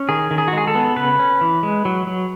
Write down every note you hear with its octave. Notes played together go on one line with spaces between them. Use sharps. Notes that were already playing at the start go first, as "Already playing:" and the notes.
Already playing: C#4
D#3 G#4
D#3
G#4
F#4
G#3 G#4
A4
B3
C#3 B4
C#4
E3
G#3
F#3
F#3